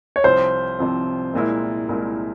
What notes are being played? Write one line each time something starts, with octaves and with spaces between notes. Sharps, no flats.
C#5
C2 C3 F3 C4 C5
C2 C3 F3 C4
C2 A#2 G#3 E4 A#4
C2 A#2 G#3 E4 A#4